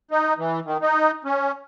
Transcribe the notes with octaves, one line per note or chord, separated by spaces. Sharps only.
D#4
E3
D#3
D#4
C#4